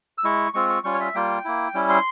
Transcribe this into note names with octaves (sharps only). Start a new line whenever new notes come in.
E6
G#3 E4 C#6
G#3 C4 F4 C#6
C#6
G3 C#4 F4 C#6
C#5
E5
G3 A#3 F4 G5
A#3 E4
G3 C#4 E4
C6